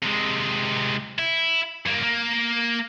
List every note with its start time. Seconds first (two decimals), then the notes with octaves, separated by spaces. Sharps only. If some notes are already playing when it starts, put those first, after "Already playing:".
0.03 C3 G#3
1.19 E4
1.86 G2 A#3
2.03 A#3